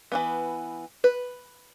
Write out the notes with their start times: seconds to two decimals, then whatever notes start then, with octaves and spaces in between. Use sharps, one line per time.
0.12 E3 F3 B3
1.04 B4